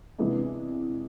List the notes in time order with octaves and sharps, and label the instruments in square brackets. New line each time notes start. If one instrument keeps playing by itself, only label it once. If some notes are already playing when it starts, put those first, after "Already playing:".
[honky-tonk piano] C3 E3 G#3 B3 D4